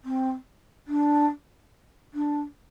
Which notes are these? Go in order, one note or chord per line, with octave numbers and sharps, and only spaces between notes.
C4
D4
D4